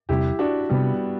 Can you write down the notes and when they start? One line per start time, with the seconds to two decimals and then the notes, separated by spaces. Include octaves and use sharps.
0.09 E2 C3 G3 E4 G4
0.39 D4 F#4
0.69 C3 G3 B3